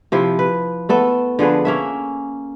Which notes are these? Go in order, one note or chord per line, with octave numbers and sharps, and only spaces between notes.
C3 F3 E4
B4
A3 B3 A4
D3 F3 G#4 B4
A#3 C#4 E5